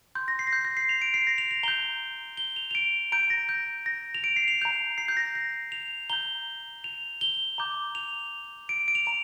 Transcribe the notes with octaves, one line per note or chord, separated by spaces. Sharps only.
C6 G6
A#6
C7
A#6
G6
A#6
C7
F7
D7
C7
A#6
F7
F7
A#5 G6 G7
G7
F7
F7
D7
A#5 G6 D7
A#6
G6
A#6
F7
D7
C7
F7
A#5 G6 F7
C7
G6
A#6
A#6
F7
A#5 G6 G7
F7
G7
A#5 D6 G6
F7
D7
D7
F7
A#5 F7